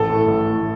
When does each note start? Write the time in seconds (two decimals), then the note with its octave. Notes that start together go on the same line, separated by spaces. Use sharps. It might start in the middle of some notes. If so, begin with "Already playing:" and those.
Already playing: A1 A4
0.10 A2 A3
0.28 A1
0.47 A2 A3